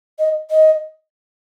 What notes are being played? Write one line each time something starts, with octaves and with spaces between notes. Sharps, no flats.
D#5
D#5